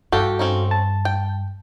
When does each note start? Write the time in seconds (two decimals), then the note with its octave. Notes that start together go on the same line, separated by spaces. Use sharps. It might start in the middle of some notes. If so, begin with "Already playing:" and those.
0.12 G2 F#4 G4 A4 F5
0.39 C4 C#4 D#4
0.71 A5
1.05 G5